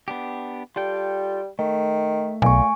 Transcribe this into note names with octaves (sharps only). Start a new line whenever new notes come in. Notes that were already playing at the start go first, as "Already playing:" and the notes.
B3 D4 G4
G3 F4 A4 G5
D#3 A3
B1 A#2 G#5 C#6